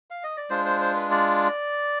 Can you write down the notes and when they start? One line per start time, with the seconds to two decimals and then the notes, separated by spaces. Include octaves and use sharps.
0.10 F5
0.24 D#5
0.37 D5
0.50 G#3 D4 F4 C5
0.66 C5
0.81 C5
0.96 B4
1.11 D5